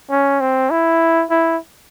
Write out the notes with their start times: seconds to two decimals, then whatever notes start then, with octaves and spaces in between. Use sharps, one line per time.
0.10 C#4
0.41 C4
0.70 E4
1.30 E4